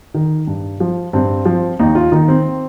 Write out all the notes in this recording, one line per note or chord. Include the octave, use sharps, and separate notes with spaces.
D#3
G2
F3
G2 C4
F3
D#2 D#4
F4
D#3 D#4
C4